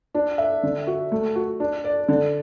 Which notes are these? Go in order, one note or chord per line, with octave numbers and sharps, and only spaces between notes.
D4
E5
D3
F#4
A3
F#4
D4
D5
D3